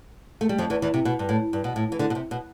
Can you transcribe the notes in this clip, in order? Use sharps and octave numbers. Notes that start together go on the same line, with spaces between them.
A3
G3
F2 F3
E2 E3
E2 E3
C3
B2
G2
A2
G2
B2
A2
E3
D2 D3
B2
C3
B2